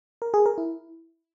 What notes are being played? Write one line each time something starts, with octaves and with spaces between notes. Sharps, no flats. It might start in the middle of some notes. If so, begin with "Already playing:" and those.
A#4
G#4
A#4
E4